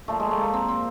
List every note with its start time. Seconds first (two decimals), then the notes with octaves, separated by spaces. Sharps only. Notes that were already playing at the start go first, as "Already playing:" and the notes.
0.08 A#2 F3 A3
0.20 G#3
0.31 A3
0.41 A#3
0.53 C4
0.68 C4